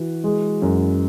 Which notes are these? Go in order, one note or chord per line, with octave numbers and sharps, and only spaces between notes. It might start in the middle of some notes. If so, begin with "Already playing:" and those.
Already playing: E3 F#4
G#3
F#2